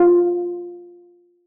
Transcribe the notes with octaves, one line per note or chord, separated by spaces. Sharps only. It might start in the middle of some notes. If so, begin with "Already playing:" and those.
Already playing: F4